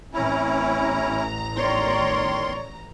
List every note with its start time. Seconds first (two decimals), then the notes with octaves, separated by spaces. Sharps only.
0.13 A1 C4 C#4 E4 A#5
1.56 D#3 C#5 D5 C6